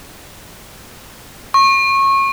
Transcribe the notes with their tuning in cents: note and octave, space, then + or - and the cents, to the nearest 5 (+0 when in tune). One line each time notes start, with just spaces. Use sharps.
C#6 -25